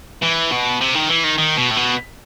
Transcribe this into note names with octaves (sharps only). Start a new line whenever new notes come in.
E3
B2
C3
D#3
E3
D#3
D#3
B2
A2
B2